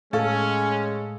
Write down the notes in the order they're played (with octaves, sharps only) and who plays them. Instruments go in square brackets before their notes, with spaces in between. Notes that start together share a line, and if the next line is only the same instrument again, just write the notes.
[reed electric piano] A2 F5 C#6 [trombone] G#3 [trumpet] C#4 [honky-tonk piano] A4